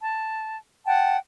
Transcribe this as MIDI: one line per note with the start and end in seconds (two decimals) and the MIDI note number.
0.01 0.58 81
0.86 1.17 78
0.86 1.17 79
0.86 1.17 81